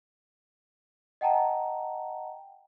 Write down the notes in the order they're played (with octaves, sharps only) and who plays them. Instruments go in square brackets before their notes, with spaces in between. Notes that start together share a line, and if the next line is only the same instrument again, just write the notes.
[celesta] D#5 F#5 G5 A5 A#5